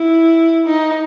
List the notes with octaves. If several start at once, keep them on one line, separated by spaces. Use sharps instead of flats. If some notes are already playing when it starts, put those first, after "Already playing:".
Already playing: E4
D#4